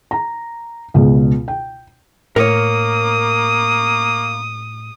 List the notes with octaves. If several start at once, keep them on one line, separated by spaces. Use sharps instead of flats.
A#5
C#2 B2 G#3
G5
A2 A#3 A#4 C#5 D#6